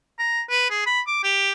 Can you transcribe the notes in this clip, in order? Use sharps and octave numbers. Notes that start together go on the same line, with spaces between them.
A#5
B4
G#4
B5
D6
G4